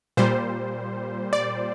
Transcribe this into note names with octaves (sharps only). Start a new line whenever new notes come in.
A#2 G3 C5
D5